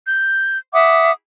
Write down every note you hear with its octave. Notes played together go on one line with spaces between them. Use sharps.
G6
E5 F#5 D6 D#6